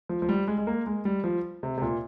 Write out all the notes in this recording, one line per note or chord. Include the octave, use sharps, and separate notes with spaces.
F3
F3
G3
G#3
G#3
A#3
G#3
G3
F3
C3
C3
A#2